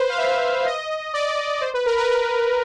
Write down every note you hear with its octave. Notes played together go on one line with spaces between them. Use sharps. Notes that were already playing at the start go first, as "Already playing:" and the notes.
Already playing: B4 C5
F5
E5
D#5
D5
C5
B4
A#4
B4
B4